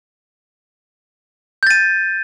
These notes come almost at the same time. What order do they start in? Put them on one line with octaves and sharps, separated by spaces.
G6 A6 D#7